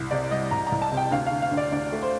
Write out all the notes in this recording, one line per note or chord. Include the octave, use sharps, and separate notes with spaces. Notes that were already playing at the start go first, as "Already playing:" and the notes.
Already playing: C2
C3 D5
G3 D#5
C2 A#5
A#5
C2
A5
C3
G5
D2 F5
F5
D3
F5
D2
D5
D2 D5
A3
C5